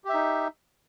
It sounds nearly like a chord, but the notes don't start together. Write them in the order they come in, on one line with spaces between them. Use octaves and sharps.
G4 E5 D#4